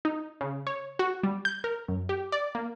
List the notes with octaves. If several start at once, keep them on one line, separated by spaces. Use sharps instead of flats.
D#4
C#3
C#5
F#4
G3
G6
A#4
F#2
G4
D5
A#3